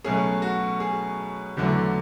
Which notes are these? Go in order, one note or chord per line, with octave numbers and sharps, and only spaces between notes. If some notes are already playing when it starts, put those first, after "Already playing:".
B2 F#3 A3 C#4 G#4
F#4
G#4
E2 D3 F#3 A3